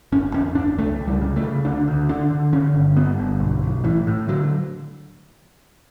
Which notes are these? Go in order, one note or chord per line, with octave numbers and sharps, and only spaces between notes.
F#1 C#4
E2 C#4
F#1 D4
C#2 A3
C#2
G3
C#3
A3
C#3
D2 D4
D2
D3 D4
D3
D3 C#4
G1
G2 B3
G1
B1
B1
A2 E3
A2
D3 F#3